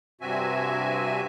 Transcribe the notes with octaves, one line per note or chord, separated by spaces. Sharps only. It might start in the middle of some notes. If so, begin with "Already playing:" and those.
G2 C3 C4 F#4 E5 G#5